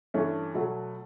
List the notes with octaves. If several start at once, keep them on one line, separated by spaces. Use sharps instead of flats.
G2 E3 A3 C#4
B2 F#3 A3